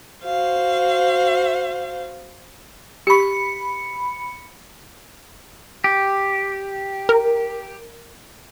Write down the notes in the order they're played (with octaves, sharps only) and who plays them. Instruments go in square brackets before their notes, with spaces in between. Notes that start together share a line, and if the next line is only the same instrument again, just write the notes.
[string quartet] F#4 C5 F5
[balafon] G4 C#6 [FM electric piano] B5 C#7
[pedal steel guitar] G4
[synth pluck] A#4